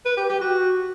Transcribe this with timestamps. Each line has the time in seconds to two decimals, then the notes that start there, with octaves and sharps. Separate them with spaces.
0.05 B4
0.17 G4
0.29 G4
0.41 F#4